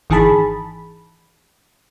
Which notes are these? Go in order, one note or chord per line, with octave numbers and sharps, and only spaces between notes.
G#1 D#3 E3 G#4 A5 B5